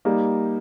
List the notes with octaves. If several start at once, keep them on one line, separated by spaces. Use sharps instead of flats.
G3 A#3 D#4